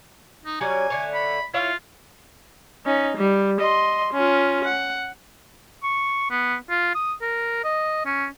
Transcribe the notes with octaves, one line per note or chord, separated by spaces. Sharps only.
D#4
F#3 G3 C#4 G#5
D3 A3 C#5
B5
E4 F4 C#5 F5
C#4 D#4
G3
D#5 C6
C#4 F4
F#5
C#6
B3
F4
D#6
A#4
D#5
C#4